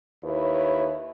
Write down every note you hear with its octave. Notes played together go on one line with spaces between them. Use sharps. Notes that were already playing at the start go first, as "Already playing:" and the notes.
D#2 E4 B4 C#5